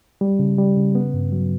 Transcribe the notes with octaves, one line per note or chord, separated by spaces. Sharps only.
G3
C#3
G3
C#3
B3
G2
F#3